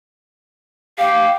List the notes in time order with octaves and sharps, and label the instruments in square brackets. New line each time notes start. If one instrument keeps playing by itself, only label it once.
[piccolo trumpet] G4 [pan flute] F5